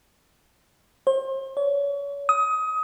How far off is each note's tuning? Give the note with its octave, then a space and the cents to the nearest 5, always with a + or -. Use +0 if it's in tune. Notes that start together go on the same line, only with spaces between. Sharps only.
C5 +35
C#5 +35
D#6 +25